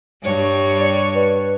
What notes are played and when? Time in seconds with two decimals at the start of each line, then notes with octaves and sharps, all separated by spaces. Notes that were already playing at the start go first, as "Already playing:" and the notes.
0.23 G2 G3 C#5
0.79 D5
1.14 B4